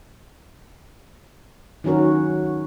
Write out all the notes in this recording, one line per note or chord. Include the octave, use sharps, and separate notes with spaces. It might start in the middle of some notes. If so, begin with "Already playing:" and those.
D#3 F#3 C#4 F#4 A#4